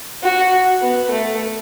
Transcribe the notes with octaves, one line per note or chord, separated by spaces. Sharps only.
F#4
B3
A3